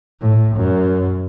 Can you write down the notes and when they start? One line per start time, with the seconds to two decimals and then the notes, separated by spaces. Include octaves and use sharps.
0.21 A2
0.56 F#2